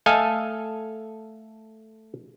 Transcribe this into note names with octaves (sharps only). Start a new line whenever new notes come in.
A3 A4 D#5 F5 G#5